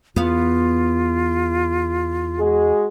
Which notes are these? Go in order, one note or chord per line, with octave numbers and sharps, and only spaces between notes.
E2 B3 F4 F5
G#3 F#4 G#4